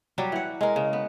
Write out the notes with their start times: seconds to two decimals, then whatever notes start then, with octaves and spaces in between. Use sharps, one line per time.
0.18 F#3 G3 G4
0.32 E3 F#5
0.61 G#3 A#4
0.76 C#3
0.93 B3